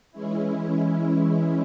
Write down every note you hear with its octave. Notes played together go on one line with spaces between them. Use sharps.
E3 G#3 C#4 E4